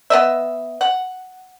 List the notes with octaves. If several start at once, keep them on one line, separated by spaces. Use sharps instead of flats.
B3 D#5 E5
F#5